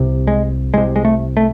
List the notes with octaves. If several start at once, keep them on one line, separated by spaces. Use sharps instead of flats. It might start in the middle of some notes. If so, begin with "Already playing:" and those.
Already playing: C2 C3
G#3
C2 C3 G#3
G#3
A3
A3